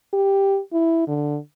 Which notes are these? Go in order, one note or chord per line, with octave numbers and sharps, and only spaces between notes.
G4
E4
D3